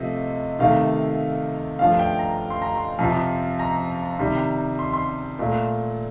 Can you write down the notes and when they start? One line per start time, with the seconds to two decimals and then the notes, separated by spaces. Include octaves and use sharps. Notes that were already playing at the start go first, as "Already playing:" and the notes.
Already playing: C3 F3 A3 D#5
0.59 C3 D#3 A3 F5
1.79 G2 F3 A3 F5
1.99 G5
2.19 A#5
2.50 C6
2.62 A#5
2.74 C6
2.99 F2 C3 F3
3.59 A#5
4.19 C3 D#3 G3
4.79 C6
4.93 C6
5.39 A#2 A3